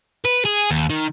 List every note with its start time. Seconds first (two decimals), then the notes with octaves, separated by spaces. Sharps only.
0.25 B4
0.45 G#4
0.71 D#2
0.90 D#3